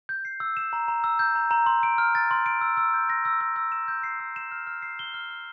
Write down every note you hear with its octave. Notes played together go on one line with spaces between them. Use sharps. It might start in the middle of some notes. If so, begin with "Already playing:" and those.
G6
C7
E6
E7
A#5
A#5
E6
G6
A#5
A#5
C6
D7
F6
A6
C6
D7
E6
E6
G6
A#6
E6
E6
E6
E7
G6
C7
E6
E7
F6
F6
C7
G7
F6
F6